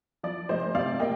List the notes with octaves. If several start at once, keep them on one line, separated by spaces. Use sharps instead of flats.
F3 D5
F1 C5 D#5
C3 D5 F5
A#3 D#5 G5